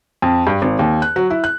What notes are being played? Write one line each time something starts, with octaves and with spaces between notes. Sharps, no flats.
F2
G2
G#1
D#2
F#6
F#3
E4
F#6